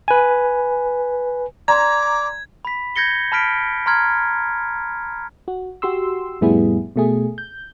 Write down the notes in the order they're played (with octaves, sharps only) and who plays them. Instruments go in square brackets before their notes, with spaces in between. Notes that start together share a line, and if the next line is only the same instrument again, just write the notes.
[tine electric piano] B4 G#5
[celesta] D5 C6 [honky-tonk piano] A#5 [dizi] D6 [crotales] G#6
[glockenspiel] B5 B6
G6 G#6 A#6 C#7 G7
A5 B5 F6 B6 D7
A#5 C6 F6 G#6
[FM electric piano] F#4
F#4 G4 C6 E6
F2 A2 G3 B3 E4 G#4
B2 A3 G#4
G6